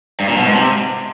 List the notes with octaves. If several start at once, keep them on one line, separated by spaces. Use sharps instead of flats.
G2
A#2
B2
G#2
C3